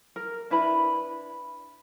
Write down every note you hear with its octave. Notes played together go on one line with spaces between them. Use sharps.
A#4
D4 E4 B4 B5